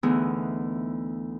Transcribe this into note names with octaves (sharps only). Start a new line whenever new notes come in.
D2 E3 B3 D#4 G#4